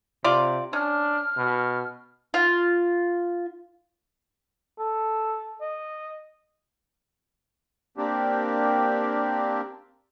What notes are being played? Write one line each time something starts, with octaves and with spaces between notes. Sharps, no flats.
C3 F4 D5
C#4 D4 F6
B2
F4
A4
D#5
A#3 C4 D4 G4